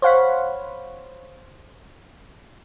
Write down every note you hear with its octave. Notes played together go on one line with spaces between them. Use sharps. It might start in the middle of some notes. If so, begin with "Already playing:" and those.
C5 C#5 F5 F#5 B5